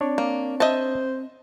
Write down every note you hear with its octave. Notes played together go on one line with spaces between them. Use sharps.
C4 D4 C#5 D5
A#3
C5 D#5 E5 A5